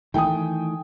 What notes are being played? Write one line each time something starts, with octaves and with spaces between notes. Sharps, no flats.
D#3 E3 A3 G5 G#5 D#6